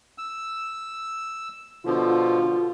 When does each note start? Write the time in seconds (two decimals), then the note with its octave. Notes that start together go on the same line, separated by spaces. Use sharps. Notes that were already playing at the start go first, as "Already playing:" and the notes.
0.18 E6
1.85 B2 D3 F3 F4